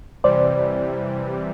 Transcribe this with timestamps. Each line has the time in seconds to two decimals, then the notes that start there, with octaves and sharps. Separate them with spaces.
0.24 C3 E3 G3 C5 D5